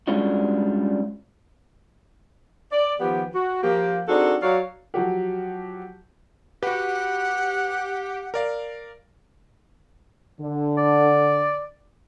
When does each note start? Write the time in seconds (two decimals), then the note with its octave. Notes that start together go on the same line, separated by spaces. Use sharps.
0.08 G3 G#3 C#4 D4 F4 F#4
2.72 D5
3.00 D#3 F3 B3 G4
3.34 F#4
3.63 F3 A#3 G4
4.08 C4 D4 D#4 F#4 G#4 A4
4.42 F#3 F#4 C#5 D5 F5
4.94 F3 F#3 F#4 G4
6.63 F#4 G4 B4 F#5
8.34 A#4 D5 F5
10.41 D3
10.78 D5